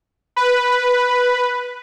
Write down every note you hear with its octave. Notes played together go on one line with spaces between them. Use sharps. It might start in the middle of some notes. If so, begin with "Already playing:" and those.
B4